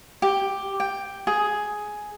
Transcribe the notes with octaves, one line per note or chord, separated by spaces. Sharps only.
G4
G5
G#4